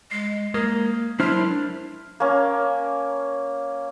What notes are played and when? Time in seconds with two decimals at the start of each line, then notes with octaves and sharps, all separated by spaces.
0.11 G#3 C7
0.54 G#3 A#3 A#4
1.20 F#3 D4 E4 C5 F6
2.20 A#3 C#4